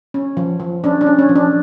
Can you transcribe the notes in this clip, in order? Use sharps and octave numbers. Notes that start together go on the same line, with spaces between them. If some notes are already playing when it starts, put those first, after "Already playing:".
C#4
F3
F3
C#4 D4
D4
C#4
C#4
F3
D4